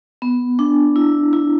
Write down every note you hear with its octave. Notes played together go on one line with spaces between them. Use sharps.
B3
D4
E4
E4